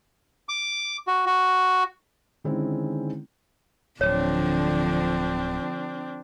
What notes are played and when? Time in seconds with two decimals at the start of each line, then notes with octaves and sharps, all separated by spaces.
0.49 D6
1.07 F#4
1.26 F#4
2.44 D3 D#3 G#3 C4 C#4 E4
4.01 D1 D3 F3 C4 D4 C#5